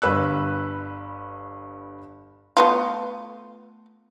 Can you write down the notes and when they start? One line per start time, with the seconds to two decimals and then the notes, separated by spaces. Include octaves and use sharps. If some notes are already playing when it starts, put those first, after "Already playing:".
0.02 G1 G2 B4 E6 F#6
2.57 A3 B3 F4